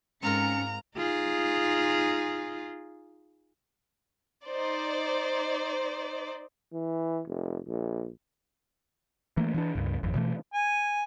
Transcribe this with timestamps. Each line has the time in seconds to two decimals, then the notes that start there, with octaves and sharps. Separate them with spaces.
0.23 G#2 C4 C#4 F4 A#4 A#5 C#7
0.97 D#4 F4 G#4
4.46 D#4 C5 D5
6.73 E3
7.27 F1
7.67 A#1
9.37 E3 A3 A#3
9.54 E3 C4 D4
9.75 C#2 G2
10.03 G#1 F2
10.15 B2 E3 A3
10.54 G#5